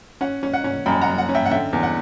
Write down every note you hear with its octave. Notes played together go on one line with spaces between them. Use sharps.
C#4 F#5
C#4
F#5
C#4
F#2 G5 B5
F#5 A#5
F#2
F#5
C#4
E5 G5
F#5
D3 E5 G5
E2
F#5